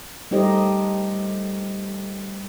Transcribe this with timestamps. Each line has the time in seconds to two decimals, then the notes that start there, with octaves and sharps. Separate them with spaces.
0.31 G3 A3 D#4 G4 C5 D#5